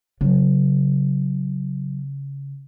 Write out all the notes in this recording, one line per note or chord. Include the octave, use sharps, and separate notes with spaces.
C#3 F#3